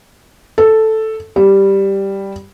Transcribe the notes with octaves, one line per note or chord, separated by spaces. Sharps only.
A4
G3